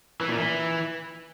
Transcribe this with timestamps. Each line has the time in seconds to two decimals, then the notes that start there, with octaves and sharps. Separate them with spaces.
0.21 E3
0.29 A#2
0.38 E3